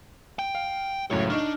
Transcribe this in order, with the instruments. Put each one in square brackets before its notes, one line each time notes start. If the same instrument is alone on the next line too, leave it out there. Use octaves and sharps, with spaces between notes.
[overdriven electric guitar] G5
[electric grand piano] F5
[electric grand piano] C#2 F#2 A2 [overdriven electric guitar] C#5
[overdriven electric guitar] D4 [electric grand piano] D#4 C#6 F6